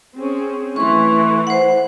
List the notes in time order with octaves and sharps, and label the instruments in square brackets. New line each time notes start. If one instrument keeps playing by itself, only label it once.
[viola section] C4 C#4 G#4
[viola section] E3 A3 E4 [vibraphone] C6 C#6
[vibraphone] C5 F#5